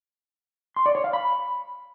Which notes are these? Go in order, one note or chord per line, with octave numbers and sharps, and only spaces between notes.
C6
D5
C#5
F5
B5